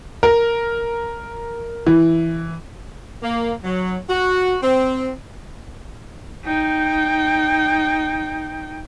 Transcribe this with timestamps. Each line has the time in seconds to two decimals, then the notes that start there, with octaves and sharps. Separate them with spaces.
0.23 A#4
1.87 E3
3.23 A#3
3.64 F#3
4.10 F#4
4.63 C4
6.45 D#4 G5